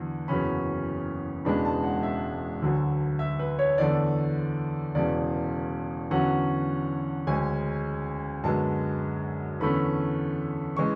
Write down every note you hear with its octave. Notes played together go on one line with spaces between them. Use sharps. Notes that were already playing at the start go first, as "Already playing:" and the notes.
Already playing: E2 D3 F#3
F#1 E2 C#3 F#3 C#4 B5
E1 E2 C#3 G#3 D4 B5
A5
F#5
E5
D2 D3 F#3
E5
B4
C#5
E2 D3 A3 D5
E1 E2 C#3 D5
E2 D3 F#3 C#4 F#5
D2 C#3 G#3 C#4 G#5
F#2 D3 G#3 B3 A5
E2 D3 A3 C#4 B5
C#3 E3 G#3 C#6